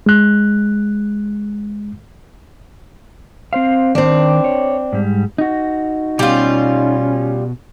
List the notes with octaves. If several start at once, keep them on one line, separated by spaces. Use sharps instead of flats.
G#3 F#6
C4 C5 F5
D#3 C4 D4
C#5
G#2 G3
D#4 F#4
B2 G3 C#4 F4